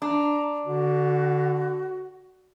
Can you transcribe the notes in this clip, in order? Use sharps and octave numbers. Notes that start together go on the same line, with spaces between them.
D4 A#5
D3 F#4